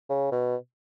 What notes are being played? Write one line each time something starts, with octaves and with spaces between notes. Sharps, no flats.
C#3
B2